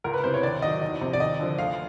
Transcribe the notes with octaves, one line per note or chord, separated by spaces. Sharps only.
C#2 A#4
B4
C3 E3 C5
C#5
D#2 D5
D#3 F#3 D#5
E2 D#5
C3 F3
D5
D#2 D#5
D3 F3
D2 F5